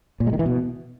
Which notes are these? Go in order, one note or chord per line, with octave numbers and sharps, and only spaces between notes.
A#2
G#3
D#3
E3
B2